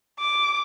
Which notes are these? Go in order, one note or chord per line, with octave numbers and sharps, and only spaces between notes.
D6